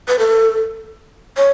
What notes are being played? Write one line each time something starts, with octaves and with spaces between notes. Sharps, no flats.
B4
A4
C#5